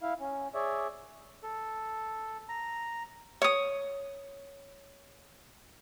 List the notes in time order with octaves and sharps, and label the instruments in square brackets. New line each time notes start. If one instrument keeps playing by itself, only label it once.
[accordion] E4 F5
C#4
G#4 C#5 D5 E5
[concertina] A4
A#5
[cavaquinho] C#5 D#6